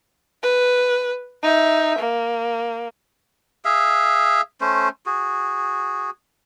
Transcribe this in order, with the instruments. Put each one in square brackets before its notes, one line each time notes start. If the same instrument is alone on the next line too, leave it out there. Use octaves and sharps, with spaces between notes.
[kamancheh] B4
D#4 E5
A#3
[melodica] G#4 E5 F5
A3 C#4 C5
F#4 G#4